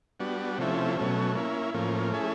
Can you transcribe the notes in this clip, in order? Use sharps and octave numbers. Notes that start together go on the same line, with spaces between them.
G3 B3 D4 F#4
C3 F3 A3 C#4 E4
B2 F#3 A3 C#4
A#3 C#4 E4
A2 F3 A#3 C#4
A3 C#4 E4 G#4